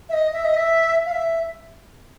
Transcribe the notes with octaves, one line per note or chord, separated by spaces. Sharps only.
E5
D#5
E5
D#5
E5
F5
E5